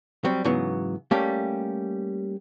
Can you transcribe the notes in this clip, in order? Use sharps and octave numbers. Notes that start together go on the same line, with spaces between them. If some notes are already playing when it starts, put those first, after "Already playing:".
F#3 G3 C4
G#2 C#3 E3 F#3 B3
G3 A3 A#3 C#4 G4 F5